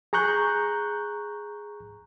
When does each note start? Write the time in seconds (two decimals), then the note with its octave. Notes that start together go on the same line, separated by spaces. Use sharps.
0.13 G#4 A#5 C#6 F#6 G6